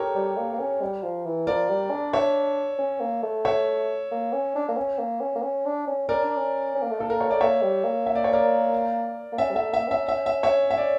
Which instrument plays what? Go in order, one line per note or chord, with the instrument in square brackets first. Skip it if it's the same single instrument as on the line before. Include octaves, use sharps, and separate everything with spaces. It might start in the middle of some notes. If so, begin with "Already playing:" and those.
Already playing: [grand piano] G4 A4 A#4 C#5
[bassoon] G3
A#3
A#3
C#4
G3
F3
E3
[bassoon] F3 [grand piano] A#4 D5
[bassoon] G3
D4
[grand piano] C#5 E5
[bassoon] C#4
A#3
A3
[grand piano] C#5 E5
[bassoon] A#3
C#4
D4
A#3
C#4
A#3
C#4
A#3
C#4
D4
C#4
[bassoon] C#4 [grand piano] A#4 D5
[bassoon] D4
C#4
C#4
A#3
A3
[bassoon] A#3 [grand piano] A4
[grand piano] A#4
C#5
[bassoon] A3 [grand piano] D5
[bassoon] A#3 [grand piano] C#5 E5
[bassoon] G3
A#3
[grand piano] E5
D5
C#5
A#4 D5
[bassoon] A#3
[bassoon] C#4 [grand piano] E5
[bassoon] G3
[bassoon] A3 [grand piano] E5
[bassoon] A#3 [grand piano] E5
[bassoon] C#4 [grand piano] E5
[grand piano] E5
E5
C#5 E5
E5
D5